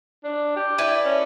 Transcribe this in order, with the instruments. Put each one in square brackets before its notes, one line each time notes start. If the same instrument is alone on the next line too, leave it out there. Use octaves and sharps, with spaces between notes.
[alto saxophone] D4
G4
[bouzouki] D4 E4 B4
[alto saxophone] C#4